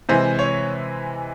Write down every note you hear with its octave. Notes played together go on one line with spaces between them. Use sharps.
C3 E3 G#3 C5
C#5